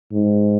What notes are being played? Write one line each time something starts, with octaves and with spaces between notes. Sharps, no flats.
G#2